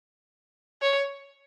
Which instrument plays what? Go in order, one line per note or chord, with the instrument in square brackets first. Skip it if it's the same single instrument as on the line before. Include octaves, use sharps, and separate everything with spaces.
[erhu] C#5